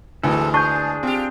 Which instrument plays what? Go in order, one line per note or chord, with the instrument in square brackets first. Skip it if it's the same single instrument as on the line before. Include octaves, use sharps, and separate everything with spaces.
[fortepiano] D2 E3 [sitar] G#2 G#3 [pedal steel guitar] A4
[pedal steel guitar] D4 G#4 G6 [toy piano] A5 C#6
[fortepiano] C4 [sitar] F4 G4